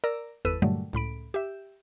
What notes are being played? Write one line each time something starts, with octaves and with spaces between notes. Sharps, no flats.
A#4 D5 A#5 E6
G1 E2 A4 B4 E6 D#7
G2 A#2 D3 F#3 G3 A3
C#2 A2 B5 D7
G4 E5